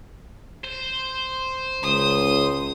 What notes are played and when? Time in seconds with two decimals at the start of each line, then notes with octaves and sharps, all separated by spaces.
0.64 C5
1.83 C#2 D#6